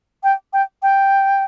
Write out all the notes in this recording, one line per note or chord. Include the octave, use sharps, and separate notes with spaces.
G5
G5
G5